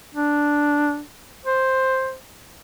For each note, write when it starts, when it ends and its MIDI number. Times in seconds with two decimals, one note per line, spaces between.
0.15 1.01 62
1.45 2.15 72